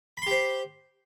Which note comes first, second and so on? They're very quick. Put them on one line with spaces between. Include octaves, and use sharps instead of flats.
B5 C6 G4 C5